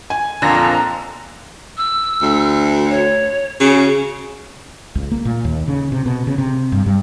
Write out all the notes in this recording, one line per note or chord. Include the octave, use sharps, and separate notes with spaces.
G#5
F2 A#2 D3 A5 A#5 A#6
E6
D2
C#5
C#3 F#4
C#2
A#3
A#2
D#2
C#3
C3
B2
C#3
C3
G2
G2